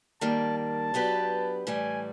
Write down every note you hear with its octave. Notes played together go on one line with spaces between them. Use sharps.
D#3 G3 A#3 A5
A5
F#3 B3 D4 G4 B4
A2 E3 G3 G#5